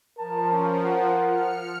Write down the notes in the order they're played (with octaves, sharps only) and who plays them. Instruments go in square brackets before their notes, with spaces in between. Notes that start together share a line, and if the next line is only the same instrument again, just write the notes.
[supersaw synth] F3 [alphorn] A#4 [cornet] A5
[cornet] C#4
F#5
[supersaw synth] F6 C#7